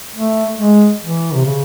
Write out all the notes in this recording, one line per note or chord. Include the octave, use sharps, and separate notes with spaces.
A3
G#3
E3
C3
C#3